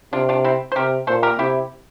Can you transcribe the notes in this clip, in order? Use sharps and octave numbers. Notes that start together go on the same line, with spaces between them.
C3 D4 F4
D4 F4
C4 E4
C5
C3 G4 A#4
A#2 A4 C5
G4 A#4
C3 E4 G4